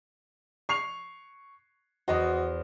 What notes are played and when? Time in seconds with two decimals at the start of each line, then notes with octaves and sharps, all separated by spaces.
0.69 C#6 C7 F7
2.08 E2 B3 F#4 C5 D#5